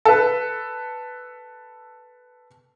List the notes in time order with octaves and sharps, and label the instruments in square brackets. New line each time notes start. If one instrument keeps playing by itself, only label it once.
[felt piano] A4 B4